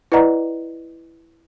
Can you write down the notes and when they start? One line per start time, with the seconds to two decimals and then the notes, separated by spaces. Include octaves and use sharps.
0.12 E4 B4 D5 D#5 F#5 A#5